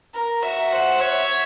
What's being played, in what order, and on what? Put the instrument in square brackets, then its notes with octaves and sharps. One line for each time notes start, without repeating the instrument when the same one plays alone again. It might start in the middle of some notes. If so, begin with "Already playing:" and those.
[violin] A#4
[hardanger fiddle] F#4 [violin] E5
[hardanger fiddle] C5 [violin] F#5
[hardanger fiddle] C#5 [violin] E5